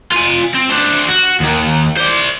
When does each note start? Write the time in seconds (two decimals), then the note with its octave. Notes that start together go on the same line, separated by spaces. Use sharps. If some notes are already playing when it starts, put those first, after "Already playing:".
0.12 F4 G#5
0.54 C4
0.70 D4 C5
1.08 F#4
1.40 D#2 D#3
1.97 C5 D5